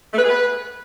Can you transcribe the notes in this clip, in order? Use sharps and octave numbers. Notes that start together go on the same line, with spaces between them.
A3
B4
G#4
B4